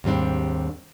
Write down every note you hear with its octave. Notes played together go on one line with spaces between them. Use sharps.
D#2 G#2 G3 C4 D4